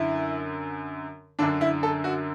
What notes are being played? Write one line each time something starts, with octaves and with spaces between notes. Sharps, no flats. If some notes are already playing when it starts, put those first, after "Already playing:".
Already playing: F#2 D3 E4
F#2 D3 D4
E4
A4
F#4